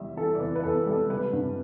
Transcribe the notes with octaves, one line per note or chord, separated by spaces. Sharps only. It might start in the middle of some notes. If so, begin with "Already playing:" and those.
Already playing: E2 G3 E5
E3 A4
D5
E2 B4
B4
E2 A4
G3 A4
G3 B4
G2